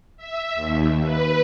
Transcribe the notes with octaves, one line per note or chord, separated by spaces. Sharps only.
E5
D#2
B4